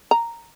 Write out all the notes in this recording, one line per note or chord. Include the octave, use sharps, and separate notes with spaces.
A#5